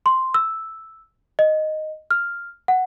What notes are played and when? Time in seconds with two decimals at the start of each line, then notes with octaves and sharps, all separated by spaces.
0.06 C6
0.34 E6
1.39 D#5
2.11 F6
2.68 F#5